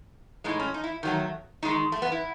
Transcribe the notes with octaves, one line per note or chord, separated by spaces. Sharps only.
A2 G#3 D#4
C#4
D#4
E4
D#3 F#3 A3
D#3 G#3 D#4
A3
B3
E4